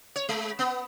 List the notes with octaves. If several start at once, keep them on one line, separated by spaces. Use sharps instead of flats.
C#5
G#3
B3